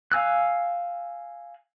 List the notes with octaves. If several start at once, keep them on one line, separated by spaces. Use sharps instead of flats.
F5 G#5 E6 F#6